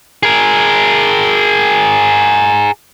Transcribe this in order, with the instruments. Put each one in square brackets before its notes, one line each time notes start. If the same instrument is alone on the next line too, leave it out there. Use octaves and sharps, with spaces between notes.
[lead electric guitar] G#4 A#4